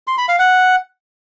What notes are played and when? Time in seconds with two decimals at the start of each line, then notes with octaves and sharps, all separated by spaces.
0.07 C6
0.18 B5
0.28 F5
0.39 F#5